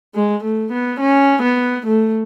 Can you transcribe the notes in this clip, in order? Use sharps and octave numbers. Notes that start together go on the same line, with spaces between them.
G#3
A3
B3
C#4
B3
A3